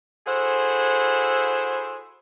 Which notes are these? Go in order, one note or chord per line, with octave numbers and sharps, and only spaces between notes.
E4 F#4 G#4 A4 C5